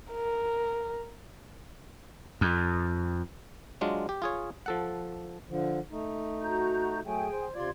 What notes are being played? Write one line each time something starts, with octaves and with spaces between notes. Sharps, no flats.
A#4
F2
F#3 G#3 D4 F4
G4
F4 G#4 C#5
F3 A4 F#5
D3 F3
A3 D#4
F#4 A#5 G6
F#3 A3 G#4 G5 G#5
C5
C3 F4 D5 C6 G#6